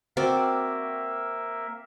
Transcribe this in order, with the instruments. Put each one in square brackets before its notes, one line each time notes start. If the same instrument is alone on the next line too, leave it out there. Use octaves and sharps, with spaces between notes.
[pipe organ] A#3 A#4 E5 [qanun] C4 F#4 D5